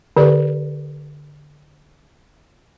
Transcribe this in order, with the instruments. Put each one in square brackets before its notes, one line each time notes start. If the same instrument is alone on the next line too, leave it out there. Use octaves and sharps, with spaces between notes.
[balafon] D3 G4 A4 B4 D5